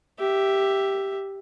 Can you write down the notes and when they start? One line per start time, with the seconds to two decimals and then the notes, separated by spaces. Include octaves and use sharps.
0.18 G4 E5